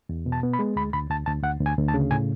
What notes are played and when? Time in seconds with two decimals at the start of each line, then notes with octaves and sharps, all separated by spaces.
0.09 E2
0.26 B2
0.32 A5
0.43 B3
0.53 B5
0.59 G#3
0.76 D2 B5
0.93 D2 B5
1.10 D2 A5
1.26 D2 A5
1.43 D2 F#5
1.60 D2
1.66 G#5
1.78 D2
1.88 A5
1.94 C#3
2.11 A2 G#5